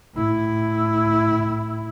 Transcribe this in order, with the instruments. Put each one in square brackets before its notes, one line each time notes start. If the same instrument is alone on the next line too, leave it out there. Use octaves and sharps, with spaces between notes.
[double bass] A2 E4